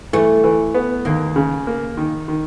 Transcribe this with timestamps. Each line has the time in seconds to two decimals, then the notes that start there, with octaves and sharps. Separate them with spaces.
0.13 E3 A3
0.44 E3
0.74 B3
1.05 D#2 A#3
1.36 C#3
1.67 A#3
1.97 D#3
2.28 D#3